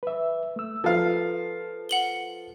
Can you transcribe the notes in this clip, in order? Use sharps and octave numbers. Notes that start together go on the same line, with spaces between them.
B4 E5
A3 E6
F3 A4 B4 F5
F#5 F#7 G7